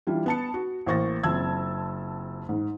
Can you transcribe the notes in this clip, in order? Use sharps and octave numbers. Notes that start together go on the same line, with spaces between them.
E3 G3 D4 F4
B3 A5 C#7
F#4
A1 A#3 C5 C#6 A6 A#6
F#1 C4 F4 A5 E6 G#6
G#2